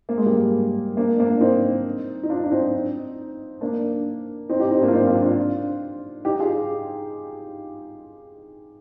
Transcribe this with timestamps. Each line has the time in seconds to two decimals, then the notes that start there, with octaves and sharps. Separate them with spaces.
0.09 A#3
0.17 G#3
0.26 G3 A#3
0.97 A#3 D4
1.19 A#3 D4
1.41 C4 D#4
2.23 D#4
2.30 D4 F4
2.44 D4
2.51 C4 D#4
3.61 A#3 D4
4.49 C4 D#4
4.59 D#4 G4
4.71 C4 D#4
4.82 A#3 D4
4.88 F4
4.92 C4 D#4
5.07 D4 F4
5.22 D4 F4
6.25 D#4 G4
6.40 F4 G#4